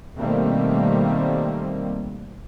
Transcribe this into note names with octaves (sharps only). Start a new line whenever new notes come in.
B2 D#3 G3 A3 A#3 C4